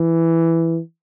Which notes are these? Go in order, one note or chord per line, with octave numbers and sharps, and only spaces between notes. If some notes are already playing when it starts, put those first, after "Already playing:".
Already playing: E3